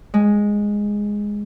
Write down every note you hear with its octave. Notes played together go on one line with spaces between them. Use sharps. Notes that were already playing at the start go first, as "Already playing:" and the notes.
G#3